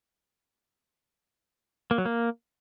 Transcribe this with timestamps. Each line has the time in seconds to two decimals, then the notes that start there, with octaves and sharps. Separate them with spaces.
1.91 A#3
1.98 F#3
2.05 A#3